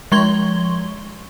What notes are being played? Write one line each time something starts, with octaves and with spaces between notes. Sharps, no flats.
F3 G#3 C6 C#6 G#6 G7